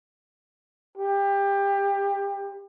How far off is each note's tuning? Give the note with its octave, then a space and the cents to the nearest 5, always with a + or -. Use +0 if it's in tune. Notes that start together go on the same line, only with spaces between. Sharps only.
G4 +25